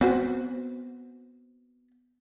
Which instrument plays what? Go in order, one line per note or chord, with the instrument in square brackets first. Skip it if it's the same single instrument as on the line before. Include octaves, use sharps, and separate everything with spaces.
[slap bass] B3 [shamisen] C4 F#4 C5